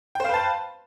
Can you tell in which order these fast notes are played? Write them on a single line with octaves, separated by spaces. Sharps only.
G5 C5 F5 B4 A5